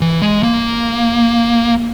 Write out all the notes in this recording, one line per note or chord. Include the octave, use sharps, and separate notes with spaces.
E3
G#3
A#3